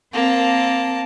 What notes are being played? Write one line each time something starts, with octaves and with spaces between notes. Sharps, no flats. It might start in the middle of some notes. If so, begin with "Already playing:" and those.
A#3 C4 A5